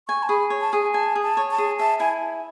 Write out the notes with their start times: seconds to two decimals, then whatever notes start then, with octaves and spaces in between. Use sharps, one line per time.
0.08 G#5 C#6
0.23 A5
0.29 G#4 B5
0.50 C#5
0.61 A5
0.72 G#4 G#5
0.94 G#5 A5
1.15 G#4
1.22 A5
1.37 C#5
1.51 A5
1.58 G#4
1.79 E5 A5
2.00 E4 G#5